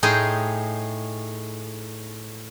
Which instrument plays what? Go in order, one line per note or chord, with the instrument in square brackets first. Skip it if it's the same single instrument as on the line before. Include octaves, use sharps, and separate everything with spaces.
[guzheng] A2 D#4 G#4 D#5 G5 C6